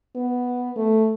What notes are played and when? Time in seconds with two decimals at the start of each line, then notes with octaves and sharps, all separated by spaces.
0.16 B3
0.76 A3